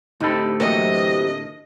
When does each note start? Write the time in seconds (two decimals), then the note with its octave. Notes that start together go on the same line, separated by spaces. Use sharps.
0.20 D2 A2 C3 D#4 A4 B5
0.60 C3 E3 F#3 A#3 D#5